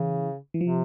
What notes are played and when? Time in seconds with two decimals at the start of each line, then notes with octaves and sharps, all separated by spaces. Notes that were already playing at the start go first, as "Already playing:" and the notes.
Already playing: C#3 E3
0.54 E3
0.61 C3 F3